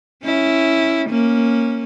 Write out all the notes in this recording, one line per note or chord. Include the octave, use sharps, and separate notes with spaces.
C#4 E4
A#3 C#4